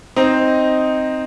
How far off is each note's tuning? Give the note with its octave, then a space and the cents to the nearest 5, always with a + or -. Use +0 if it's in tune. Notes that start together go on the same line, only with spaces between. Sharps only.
C4 +0 D#4 +0 D#5 +0